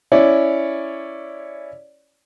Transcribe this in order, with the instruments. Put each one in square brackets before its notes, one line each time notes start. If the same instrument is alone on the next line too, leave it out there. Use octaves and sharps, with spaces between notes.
[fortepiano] C#4 E4 C#5 D5